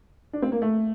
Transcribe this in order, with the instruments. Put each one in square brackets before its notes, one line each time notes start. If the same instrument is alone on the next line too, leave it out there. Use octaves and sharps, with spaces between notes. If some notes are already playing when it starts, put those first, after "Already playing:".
[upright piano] D4
C4
A#3
A3